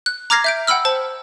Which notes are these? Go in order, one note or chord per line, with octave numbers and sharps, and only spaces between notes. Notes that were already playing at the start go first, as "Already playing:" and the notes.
F#6
A#5 D6 F6 G#6 A#6 C7
E5 G6 D7
F#5 G5 B5 E6 F6
C5 A5